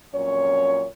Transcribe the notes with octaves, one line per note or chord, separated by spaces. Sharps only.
F2 A#2 F#3 C#4 C#5